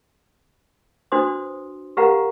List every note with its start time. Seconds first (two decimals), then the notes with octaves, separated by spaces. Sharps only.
1.12 D4 F#4 B4 C5 C6 D#6
1.97 G4 A#4 B4 F5 F#5 A#5